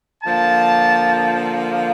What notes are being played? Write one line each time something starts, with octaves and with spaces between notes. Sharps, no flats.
D3 F3 A#3 A5